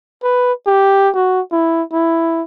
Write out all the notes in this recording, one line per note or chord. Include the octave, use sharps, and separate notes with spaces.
B4
G4
F#4
E4
E4